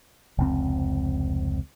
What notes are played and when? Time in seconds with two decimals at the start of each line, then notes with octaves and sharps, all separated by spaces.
0.38 F1 C#2 C4